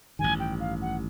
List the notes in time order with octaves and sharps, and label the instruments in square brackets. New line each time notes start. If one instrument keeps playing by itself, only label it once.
[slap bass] A1 G2 D#3 [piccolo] G#5
[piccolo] G5
F5
F#5